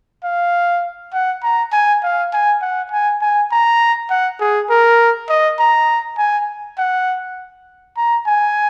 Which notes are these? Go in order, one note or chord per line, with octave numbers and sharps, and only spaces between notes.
F5
F#5
A#5
G#5
F5
G#5
F#5
G#5
G#5
A#5
F#5
G#4
A#4
D#5
A#5
G#5
F#5
A#5
G#5